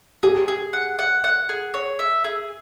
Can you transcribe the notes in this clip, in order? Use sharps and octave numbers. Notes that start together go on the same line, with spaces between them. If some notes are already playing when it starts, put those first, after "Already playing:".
G4 G#4
G#4
F#5
F#5
F#5
G#4
C#5
E5
G#4